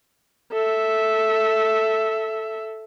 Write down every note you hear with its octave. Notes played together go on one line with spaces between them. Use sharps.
A4 E5